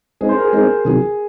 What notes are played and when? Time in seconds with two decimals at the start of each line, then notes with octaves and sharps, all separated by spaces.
0.21 G#3 C4 D#4 G#4
0.29 C5
0.37 A#4
0.45 G#4
0.53 G#3 C4 D#4 A#4
0.85 C3 D#3 F#3 G#4